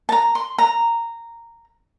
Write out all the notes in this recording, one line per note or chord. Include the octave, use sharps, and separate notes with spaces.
A5
A#5
C6
A#5